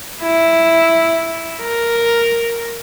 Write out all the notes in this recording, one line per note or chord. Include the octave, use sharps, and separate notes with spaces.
E4
A#4